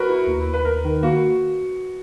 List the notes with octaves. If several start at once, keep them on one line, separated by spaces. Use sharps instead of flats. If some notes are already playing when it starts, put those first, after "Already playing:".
Already playing: F#4 A#4 B4
E4
D#2
D#2
B4
D#2 A#4
D#3
A#3 F#4